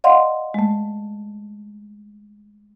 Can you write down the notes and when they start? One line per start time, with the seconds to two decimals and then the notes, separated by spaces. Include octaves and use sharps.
0.04 D5 D#5 F5 F#5 C6
0.54 G#3 A3